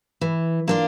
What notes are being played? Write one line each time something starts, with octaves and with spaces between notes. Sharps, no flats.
E3
A#3 D4 F4